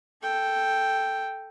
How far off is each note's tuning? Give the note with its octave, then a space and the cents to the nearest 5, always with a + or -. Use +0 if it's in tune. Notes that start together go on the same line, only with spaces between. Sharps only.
A4 +0 G5 +0